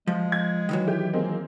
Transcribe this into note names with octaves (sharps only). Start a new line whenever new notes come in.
F3 G#3
G#6
D#3 E3 F#3
E4 G4
G#3 A#3 C4